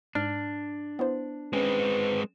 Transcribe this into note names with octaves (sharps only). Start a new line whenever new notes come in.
G#2 D4 F6
B3 E4 C5
G#3 C4 C#4 B4